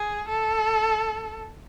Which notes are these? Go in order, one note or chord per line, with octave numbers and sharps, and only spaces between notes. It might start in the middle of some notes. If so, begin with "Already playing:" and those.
Already playing: G#4
A4